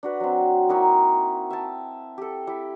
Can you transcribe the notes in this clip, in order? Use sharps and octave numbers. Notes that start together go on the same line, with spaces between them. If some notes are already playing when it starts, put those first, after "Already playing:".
D4 F#4 B4
F#3 C4
A#3 D#4 E4 F#4
E5 G5 A5
G4 A4
E4 G4